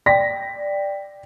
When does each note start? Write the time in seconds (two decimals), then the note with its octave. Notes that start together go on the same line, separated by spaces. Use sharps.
0.06 D5 G5 A#6 B6